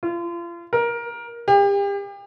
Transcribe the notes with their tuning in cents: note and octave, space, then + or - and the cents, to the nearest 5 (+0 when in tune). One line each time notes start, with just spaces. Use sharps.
F4 -35
A#4 +15
G4 +35